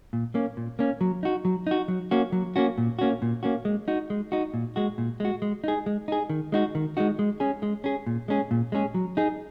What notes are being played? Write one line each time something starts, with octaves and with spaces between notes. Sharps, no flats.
A#2
A#3 C#4
A#2
A#3 C#4
F#3
D#4 F#4
F#3
D#4 F#4
F#3
A#3 C#4 F#4
F#3
A#3 C#4 F#4
A#2
A#3 C#4 F#4
A#2
A#3 C#4 F#4
G#3
D#4 F#4
G#3
D#4 F#4
A#2
G#3 F#4
A#2
G#3 F#4
G#3
D#4 G#4
G#3
D#4 G#4
D#3
G#3 D#4 F#4
D#3
G#3 D#4 F#4
G#3
C#4 G#4
G#3
C#4 G#4
A#2
G#3 C#4 G#4
A#2
G#3 C#4 G#4
F#3
D#4 G#4